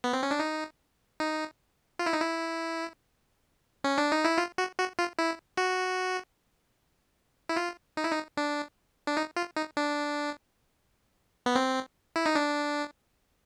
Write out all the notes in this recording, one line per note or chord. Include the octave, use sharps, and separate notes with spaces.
B3
C4
C#4
D4
D#4
D#4
F4
E4
D#4
E4
C#4
D4
D#4
E4
F4
F#4
F#4
F4
E4
F#4
E4
F4
D#4
E4
D#4
D4
D4
D#4
F4
D#4
D4
B3
C4
E4
D#4
D4